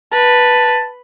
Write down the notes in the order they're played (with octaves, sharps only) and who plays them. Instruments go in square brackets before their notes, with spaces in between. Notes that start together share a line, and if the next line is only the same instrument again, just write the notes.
[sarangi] B4 [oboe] A5